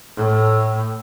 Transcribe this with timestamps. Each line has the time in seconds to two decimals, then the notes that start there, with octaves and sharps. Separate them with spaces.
0.17 A2